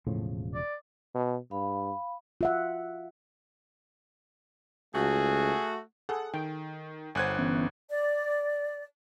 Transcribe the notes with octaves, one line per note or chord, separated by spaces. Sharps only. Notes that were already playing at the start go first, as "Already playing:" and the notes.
E1 A2 C#3 F3
D5
B2
G2 F5 B5
F4 E5 F#5
C#2 A3 F#4 G#4
G#4 A4 F#5
D#3 G5
G1 C5 F#5 G#5 F#6 G#6
E3 B3 C#4
D5